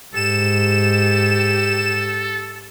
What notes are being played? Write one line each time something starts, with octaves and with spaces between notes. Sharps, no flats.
G#2 G4 A4 E7